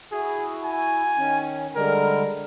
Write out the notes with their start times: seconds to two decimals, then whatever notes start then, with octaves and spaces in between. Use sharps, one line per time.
0.12 E4 F#4 G#4
0.64 G#5
1.18 D#3 C#4
1.75 D3 G3 G#3 A#4